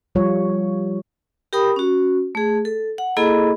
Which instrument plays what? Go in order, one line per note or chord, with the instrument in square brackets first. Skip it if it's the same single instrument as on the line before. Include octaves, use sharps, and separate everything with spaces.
[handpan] F3 G3 F4 C#5
[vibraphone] G4 A#4 G5 B5 D#6
C#4 F#4
A3 G#4
A4
F#5
A#3 E4 G#4 A4 D#5 B5